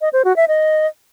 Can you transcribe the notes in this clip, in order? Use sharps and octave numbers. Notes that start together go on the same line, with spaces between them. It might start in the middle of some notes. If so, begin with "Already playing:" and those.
D#5
C5
F#4
E5
D#5